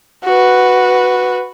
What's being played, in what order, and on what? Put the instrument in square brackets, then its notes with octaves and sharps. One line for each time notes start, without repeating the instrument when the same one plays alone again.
[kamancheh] F#4 B4